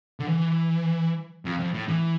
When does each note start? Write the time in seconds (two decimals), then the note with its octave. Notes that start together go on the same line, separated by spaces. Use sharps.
0.20 D3
0.27 E3
1.45 F2
1.59 F2
1.74 A2
1.89 E3